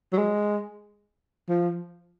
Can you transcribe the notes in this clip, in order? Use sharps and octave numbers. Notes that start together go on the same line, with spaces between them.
F#3
G#3
F3